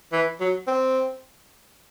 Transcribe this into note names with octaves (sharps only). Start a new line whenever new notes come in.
E3
F#3
C4